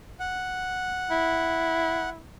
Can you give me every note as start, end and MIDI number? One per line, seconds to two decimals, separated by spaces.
0.20 2.10 78
1.11 2.23 64